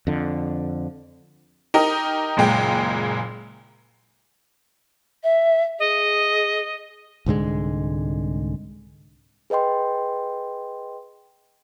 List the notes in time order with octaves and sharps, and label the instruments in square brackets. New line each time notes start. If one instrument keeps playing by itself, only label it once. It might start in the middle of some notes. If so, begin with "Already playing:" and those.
[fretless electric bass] F2 D3
[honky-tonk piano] D#4 G4 A#4 D#5
F#1 A#2 G#3 G5
[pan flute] E5
[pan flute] G#4 [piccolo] D#5
[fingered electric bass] C2 G#2 D3 G#3
[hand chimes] G#4 B4 D#5 G5 C6